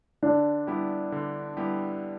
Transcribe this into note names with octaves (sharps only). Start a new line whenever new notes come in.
D3 D4
G3 B3 E4 G4
D3
G3 B3 E4 G4